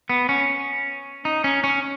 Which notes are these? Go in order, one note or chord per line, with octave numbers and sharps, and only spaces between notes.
B3
C#4
D#4
C#4
C#4